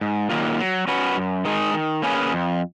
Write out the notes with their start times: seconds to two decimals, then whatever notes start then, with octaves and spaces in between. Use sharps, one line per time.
0.01 G#2
0.30 D#3 F#3 A#3 F4
0.59 F#3
0.87 C#4 F#4 B4
1.17 F#2
1.45 D#3 G#3 D#4 G#4
1.74 D#3
2.02 A#3 C#4 G#4 B4
2.32 F2